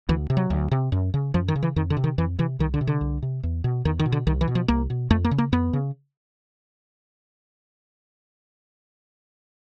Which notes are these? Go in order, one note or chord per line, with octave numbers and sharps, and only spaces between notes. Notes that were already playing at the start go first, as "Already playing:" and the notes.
D2 E3
C3
F#3
D2
C3
F#2
C#3
F#2 F3
D#3
C#3
E3
F2 D#3
D3
C3
D#3
F2 E3
C3 E3
C2 D#3
D3
C3
D3
C2
C3
E2
B2
E2 D#3
D#3
B2
D3
C2 D#3
E3
B2
F3
C2 A#3
B2
F2 A3
A#3
C#3
A#3
F2 B3
C#3